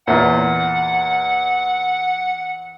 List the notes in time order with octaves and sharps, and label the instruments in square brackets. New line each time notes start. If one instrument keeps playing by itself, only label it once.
[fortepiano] E2 A#2 [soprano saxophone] F#5